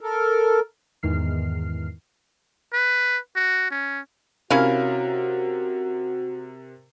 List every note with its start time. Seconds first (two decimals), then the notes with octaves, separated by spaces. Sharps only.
0.01 A4 A#4
1.03 E2 G#2 D#3 F6 C7
2.73 B4
3.36 F#4
3.71 C#4
4.50 C3 C#4 E4 F#4 A#4 F5